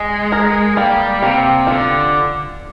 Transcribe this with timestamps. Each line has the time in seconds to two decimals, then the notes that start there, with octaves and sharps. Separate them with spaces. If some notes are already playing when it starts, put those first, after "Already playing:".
Already playing: G#3 D#5
0.32 A#4
0.77 G3 A#3
1.22 C3 A#3
1.67 D3 F4